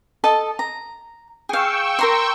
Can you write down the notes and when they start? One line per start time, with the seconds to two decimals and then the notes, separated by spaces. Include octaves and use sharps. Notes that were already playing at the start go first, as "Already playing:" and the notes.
0.24 A4 D#5 A5
0.59 A#5
1.49 G#4 F5 G5 C#6 E6
1.99 A#4 A#5 C6